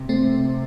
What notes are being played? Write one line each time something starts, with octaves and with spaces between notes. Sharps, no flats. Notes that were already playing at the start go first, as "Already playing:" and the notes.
Already playing: C3
A3 C4